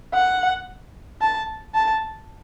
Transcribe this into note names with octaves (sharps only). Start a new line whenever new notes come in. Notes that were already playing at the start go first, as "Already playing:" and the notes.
F#5
A5
A5